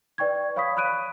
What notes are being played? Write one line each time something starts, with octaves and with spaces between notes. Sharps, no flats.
B4 D5 G5 C#6 G#6
C#5 F5 B5 C#6 D#6 B6
B5 D#6 F#6 D7 D#7